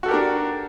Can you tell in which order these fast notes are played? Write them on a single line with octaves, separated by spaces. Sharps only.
F#4 A4 G4 A#4 D4